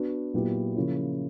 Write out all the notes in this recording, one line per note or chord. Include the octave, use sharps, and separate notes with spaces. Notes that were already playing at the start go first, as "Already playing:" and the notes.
Already playing: B3 D4 F#4
A#2 F#3 B3 E4 G4
C#3 F3 A#3 C#4 E4